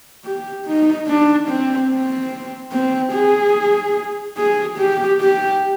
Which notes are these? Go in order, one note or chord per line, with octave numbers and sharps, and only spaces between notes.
G4
D#4
D4
C4
C4
C4
G#4
G#4
G4
G4